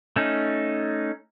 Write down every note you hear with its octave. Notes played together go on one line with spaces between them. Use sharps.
A3 C#4 D#4